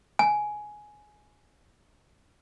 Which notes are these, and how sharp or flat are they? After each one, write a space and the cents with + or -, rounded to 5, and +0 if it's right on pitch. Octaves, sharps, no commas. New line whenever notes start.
G#5 +10